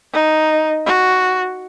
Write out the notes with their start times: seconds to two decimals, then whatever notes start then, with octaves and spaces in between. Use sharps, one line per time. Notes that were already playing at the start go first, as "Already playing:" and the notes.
0.13 D#4
0.86 F#4